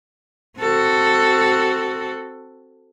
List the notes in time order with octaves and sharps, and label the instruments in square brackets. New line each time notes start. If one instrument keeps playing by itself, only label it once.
[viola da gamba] C4 F#4 A4